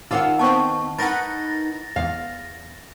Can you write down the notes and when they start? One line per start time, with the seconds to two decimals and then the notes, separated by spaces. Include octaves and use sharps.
0.11 D#3 D#4 F4 F5 F#5 E6
0.39 B3 C4 A5 C#6
0.98 D#4 A#4 B4 F#5 A6 A#6
1.96 E2 F5